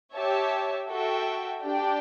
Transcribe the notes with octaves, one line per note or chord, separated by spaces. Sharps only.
G4 C#5 E5 A5
F#4 A4 E5 G5
D4 G4 D5 G5